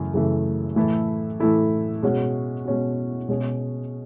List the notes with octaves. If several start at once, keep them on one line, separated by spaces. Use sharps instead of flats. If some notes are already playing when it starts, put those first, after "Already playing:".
Already playing: F#2 C#3 E3 A3
F#2 C#3 E3 A3
A2 E3 A3 E4 A4
A2 E3 A3 E4 A4
B2 G#3 C#4 F#4
B2 G#3 C#4 F#4
B2 G#3 C#4 G#4